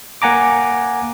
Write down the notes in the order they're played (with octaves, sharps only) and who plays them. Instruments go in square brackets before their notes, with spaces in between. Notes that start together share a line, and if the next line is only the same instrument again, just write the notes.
[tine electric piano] A#3 F#5 G#5 A#5 D6